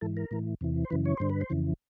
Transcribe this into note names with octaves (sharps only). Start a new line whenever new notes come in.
G#2 E3 A4
A#4
A2 E3
E2 C3 E3
C5
F#2 C#3 E3 B4
C#5
G2 D3 C5
B4
C5
F2 C#3 E3